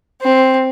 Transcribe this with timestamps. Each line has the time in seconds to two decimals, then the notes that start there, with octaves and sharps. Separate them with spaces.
0.22 C4